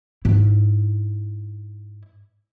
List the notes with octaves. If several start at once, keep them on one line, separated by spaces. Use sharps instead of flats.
G#2 E4